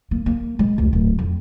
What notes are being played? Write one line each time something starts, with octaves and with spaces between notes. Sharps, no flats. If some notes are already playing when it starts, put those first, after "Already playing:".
A#3
A#3
G#3
F1 C#2
D1
F2